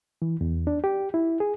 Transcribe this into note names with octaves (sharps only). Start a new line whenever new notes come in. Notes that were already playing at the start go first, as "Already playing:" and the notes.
E3
E2
D4
G4
E4
G#4